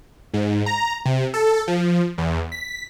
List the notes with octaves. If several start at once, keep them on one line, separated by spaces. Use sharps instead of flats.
G#2
A#5
C3
A4
F3
E2
B6